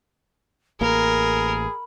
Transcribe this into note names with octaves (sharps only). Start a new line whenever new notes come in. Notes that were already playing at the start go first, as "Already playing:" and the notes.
A1 A#3 G#4 A#4 B5